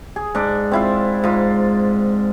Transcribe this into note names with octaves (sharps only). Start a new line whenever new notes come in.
G#4
G#2 D4
C4 E4 F4
G#2 F4